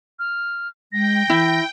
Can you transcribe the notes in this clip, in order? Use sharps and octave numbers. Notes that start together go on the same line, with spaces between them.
F6
G#3 G5 A#6
E3 E4